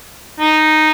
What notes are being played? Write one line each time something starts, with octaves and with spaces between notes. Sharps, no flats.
D#4